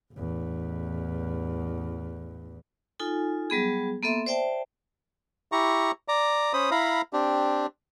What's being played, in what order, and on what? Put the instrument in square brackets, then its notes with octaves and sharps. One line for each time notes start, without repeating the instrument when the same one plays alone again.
[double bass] A1 E2
[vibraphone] D#4 F4 A4 G#5
F#3 G3 B3 G#4
A#3 B3 A4 E5 C6
C5 D5 E5 G5 A5
[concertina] E4 G4 A#5 C#6
D5 A#5
C#4 C5 B5 D#6
E4 F5 A#5 B5
C4 D4 G4